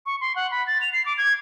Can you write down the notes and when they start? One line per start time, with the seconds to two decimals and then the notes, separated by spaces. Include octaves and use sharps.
0.06 C#6
0.21 C6
0.36 F#5
0.51 B5
0.67 A6
0.81 F7
0.93 C7
1.06 D6
1.18 G#6